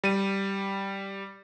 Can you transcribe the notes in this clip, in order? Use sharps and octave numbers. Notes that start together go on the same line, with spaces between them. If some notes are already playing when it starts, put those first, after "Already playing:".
G3 D#7